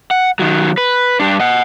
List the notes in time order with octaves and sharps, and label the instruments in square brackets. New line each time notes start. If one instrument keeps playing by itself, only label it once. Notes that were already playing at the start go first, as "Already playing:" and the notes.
[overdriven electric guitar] F#5
D#3 F#3
B4
G2 D4
D#5 F#5